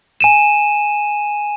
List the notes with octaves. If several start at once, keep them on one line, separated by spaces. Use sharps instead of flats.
G#5 D#7 E7